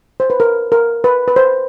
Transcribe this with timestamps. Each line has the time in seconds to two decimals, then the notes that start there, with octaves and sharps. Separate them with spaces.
0.20 C5
0.30 B4
0.40 A#4
0.72 A#4
1.04 B4
1.28 B4
1.36 C5